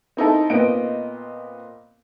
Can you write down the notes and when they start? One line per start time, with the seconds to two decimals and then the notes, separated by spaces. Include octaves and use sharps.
0.17 C4 D#4 E4 A4
0.50 A#2 B3 C4 D#5 D7